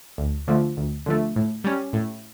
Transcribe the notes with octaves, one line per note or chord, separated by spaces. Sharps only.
D2
D3 F3 A3
D2
D3 F3 A3
A2
G3 C#4
A2